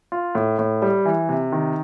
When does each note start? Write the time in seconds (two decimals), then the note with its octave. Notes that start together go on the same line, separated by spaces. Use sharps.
0.12 F4
0.35 A2
0.59 A2
0.82 G3
1.05 E3
1.29 C3
1.52 D#3